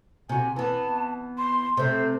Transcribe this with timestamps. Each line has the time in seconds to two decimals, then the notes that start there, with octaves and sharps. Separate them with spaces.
0.29 C3 F#4 G#5
0.56 E3 B3 A5
1.38 C6
1.77 C3 A3 C5